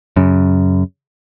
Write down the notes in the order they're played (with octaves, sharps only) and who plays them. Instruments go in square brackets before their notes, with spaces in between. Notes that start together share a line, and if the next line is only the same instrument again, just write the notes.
[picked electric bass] F#2 C#3